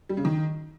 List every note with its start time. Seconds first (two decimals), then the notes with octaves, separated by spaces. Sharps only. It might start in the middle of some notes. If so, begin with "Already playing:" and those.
0.09 G3
0.17 C#3
0.25 D#3